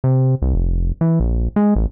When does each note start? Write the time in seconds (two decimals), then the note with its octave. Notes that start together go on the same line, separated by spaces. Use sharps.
0.04 C3
0.42 C2
0.54 F1
1.01 E3
1.20 A#1
1.56 G#3
1.76 A1